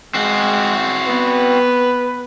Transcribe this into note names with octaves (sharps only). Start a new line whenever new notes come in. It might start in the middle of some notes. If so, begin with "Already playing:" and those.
G#3 C4 F#4
B3 B4